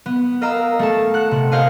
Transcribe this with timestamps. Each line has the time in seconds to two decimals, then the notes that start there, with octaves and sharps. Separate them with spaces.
0.06 B3
0.41 A#4 D#5 F5 A#5 E6
0.79 A3 A4 A5
1.14 F#5 F#6
1.31 C3
1.52 A#4 C5 D#5 F5 F#5 G#5